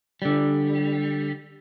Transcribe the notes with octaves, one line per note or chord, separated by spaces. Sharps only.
D3 G3